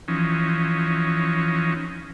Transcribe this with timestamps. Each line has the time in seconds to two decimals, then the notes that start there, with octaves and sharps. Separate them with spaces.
0.08 E3 F3 C#4 D#4